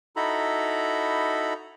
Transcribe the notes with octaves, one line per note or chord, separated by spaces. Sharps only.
D#4 E4 F#4 A4 A#5 B5